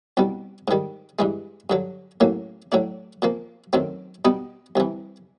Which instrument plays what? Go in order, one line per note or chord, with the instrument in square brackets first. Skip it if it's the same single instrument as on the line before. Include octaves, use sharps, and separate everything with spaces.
[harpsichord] C2 B2 G3
G#2 D#3 G3
G2 E3 G#3
G2 D3 F#3
A1 A2 F#3 A#3
A2 F#3 A3 D4
A#2 F3 A#3
F#2 D#3 F#3 A3 C4
B2 G3 B3 D#4
C2 C3 E3